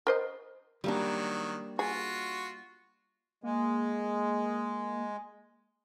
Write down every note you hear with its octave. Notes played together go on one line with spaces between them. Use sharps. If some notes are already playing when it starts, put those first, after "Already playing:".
A#4 C5 D#5
D#3 F#3 G3 A#3 D4
F4 F#4 G#4 C#6
G#3 A#3